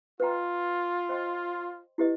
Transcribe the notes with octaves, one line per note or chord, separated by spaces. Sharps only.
F4 B4 D#5 G5 A#5
C5 D#5 G5 C6
E4 G4 B4 D#5